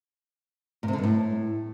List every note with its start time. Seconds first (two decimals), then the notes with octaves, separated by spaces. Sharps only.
0.83 A#2
0.88 C3
0.93 D3
0.98 G2
1.03 A2